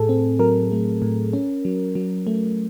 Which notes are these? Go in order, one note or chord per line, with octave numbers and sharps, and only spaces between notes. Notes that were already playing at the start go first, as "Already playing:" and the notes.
Already playing: A2 A3 G#4 A4
C4
F#3 A#4
A3
A2
C#4
F#3
F#3
A3